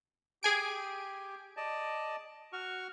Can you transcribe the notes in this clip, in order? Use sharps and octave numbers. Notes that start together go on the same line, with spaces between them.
G4 G#4 G#5 D7
D5 D#5 A5
F#4 C#6 F6